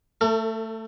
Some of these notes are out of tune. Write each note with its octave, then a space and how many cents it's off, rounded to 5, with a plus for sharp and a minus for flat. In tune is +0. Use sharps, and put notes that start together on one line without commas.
A3 +15 A4 +45